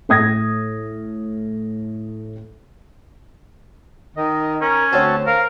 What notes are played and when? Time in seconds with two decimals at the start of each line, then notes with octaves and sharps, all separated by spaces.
0.09 A2 D#6 G#6 A#6
4.17 D#3 D#5
4.61 C#4 A#4
4.92 D2 C4 F#4 C5 C#5 A5
5.27 A#4 F5